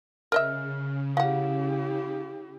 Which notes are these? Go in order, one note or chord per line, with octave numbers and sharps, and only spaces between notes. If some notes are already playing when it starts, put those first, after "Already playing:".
C#3 A#4 D#5 E5 F6
F#3 E4 G4 F5 F#5